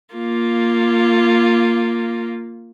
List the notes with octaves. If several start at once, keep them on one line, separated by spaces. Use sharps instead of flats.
A#3 F4